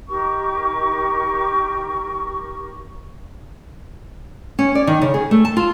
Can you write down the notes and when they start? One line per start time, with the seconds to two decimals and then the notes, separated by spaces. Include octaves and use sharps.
0.09 D#4 G4 A#4 C#6
4.59 C#4
4.75 D5
4.87 D#3
5.02 C#3
5.14 G#4
5.31 A3
5.45 A5
5.57 F4